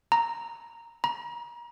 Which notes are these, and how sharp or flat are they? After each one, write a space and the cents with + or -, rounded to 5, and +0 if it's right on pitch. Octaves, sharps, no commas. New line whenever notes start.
A#5 -5
A#5 +35